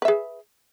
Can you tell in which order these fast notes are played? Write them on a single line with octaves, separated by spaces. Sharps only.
B4 E5 G#4